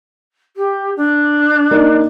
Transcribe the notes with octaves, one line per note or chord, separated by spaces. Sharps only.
G4
D4
A#3 D#4 D5